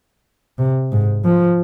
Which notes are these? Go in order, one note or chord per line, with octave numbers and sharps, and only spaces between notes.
C3
G#2
F3